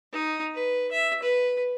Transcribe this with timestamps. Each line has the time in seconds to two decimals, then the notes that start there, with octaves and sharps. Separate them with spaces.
0.13 D#4
0.54 B4
0.91 E5
1.23 B4